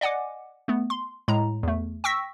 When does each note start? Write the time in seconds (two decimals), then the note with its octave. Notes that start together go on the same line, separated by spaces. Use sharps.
0.01 D5 D#5 F#5 G#5 D6
0.68 A3 B3
0.90 C6
1.28 A2 G#3 A#5
1.63 E2 A3
2.04 G5 C#6 E6 A#6 B6